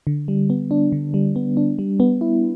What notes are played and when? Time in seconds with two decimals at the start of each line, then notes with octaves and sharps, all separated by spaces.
0.07 D3
0.28 G3
0.50 B3
0.71 D4
0.92 D3
1.14 G3
1.36 B3
1.57 D4
1.79 G3
2.00 B3
2.21 E4